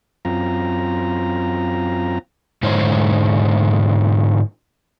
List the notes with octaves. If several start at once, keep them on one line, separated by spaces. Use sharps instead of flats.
F#2 C4 F4 A#5
G#2 D3 E4 C5 C#5